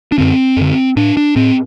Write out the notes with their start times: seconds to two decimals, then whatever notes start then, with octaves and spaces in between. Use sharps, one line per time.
0.12 D4
0.18 F#2 D3 C4
0.57 F#2 D3
0.96 A2 D4
1.17 D4
1.36 A2 C4